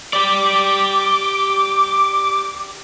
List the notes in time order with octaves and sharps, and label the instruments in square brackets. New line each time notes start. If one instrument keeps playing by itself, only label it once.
[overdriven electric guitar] G4 D5 [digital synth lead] D6